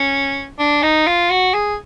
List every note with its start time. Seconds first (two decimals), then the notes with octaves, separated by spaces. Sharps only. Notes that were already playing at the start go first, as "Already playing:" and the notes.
Already playing: C#4
0.59 D4
0.83 D#4
1.07 F4
1.30 F#4
1.54 G#4